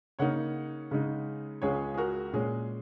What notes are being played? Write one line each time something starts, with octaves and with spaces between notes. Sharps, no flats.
C#3 A#3 D#4 C#5 F#5
C#3 G#3 D#4
C#2 C#3 G#3 G#4 C#5
G#4
F#4 A#4
A#2 G#3 C#4 G#4